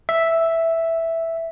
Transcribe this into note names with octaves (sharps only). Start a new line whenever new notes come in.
E5